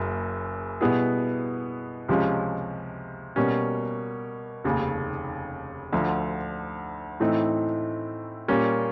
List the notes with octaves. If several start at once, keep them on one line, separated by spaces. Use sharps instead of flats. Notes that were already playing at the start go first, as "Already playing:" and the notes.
Already playing: F#1 F#2 C#3 A#3
B2 G3 B3 E4 G#4
C#2 C3 F3 G#3 C#4
B2 G3 A#3 C#4
F1 D#2 C#3
D2 D3 F3
A2 E3 A3 C4 D#4
A#2 G3 A#3 C#4